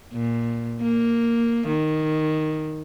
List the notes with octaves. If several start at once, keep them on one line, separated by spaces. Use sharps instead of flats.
A#2
A#3
D#3